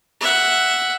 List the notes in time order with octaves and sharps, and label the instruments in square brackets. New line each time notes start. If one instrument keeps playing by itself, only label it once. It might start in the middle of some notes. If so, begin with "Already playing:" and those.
[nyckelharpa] E5 F#5